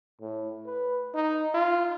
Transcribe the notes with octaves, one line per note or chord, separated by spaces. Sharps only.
A2
B4
D#4
F4